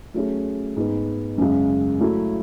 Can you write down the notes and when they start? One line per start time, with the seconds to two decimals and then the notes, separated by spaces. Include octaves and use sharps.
0.14 F#3 A3 C#4 G#4
0.76 G#2 G#3 B3
1.38 F#2 C#3 G#3
2.00 F#3 A3 E4 A4